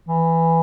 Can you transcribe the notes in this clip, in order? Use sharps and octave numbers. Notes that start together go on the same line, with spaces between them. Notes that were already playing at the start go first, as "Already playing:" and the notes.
E3